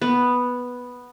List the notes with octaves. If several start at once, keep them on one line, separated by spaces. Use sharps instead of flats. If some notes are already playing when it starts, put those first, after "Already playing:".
B3